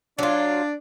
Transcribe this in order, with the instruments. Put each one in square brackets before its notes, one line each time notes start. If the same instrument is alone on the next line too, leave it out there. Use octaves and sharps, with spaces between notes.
[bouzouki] F#3 F4 [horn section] D4 D5